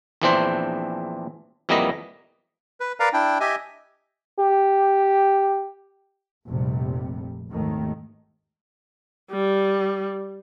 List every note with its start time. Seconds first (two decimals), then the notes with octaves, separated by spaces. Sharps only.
0.22 A#1 E2 E3 C4 D4 C5
1.69 F2 E3 G3 A#3 B3 D#5
2.80 B4
3.00 A#4 B4 D5 F5 A#5
3.13 D4 E4 G5
3.40 G4 D#5 E5 G#5
4.39 G4
6.46 F1 A#1 C3 G3
7.50 G#1 D#2 D#3 A3
9.31 G3